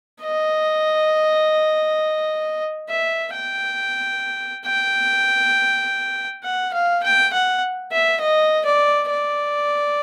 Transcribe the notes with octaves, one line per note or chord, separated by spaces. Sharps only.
D#5
E5
G5
G5
F#5
F5
G5
F#5
E5
D#5
D5
D5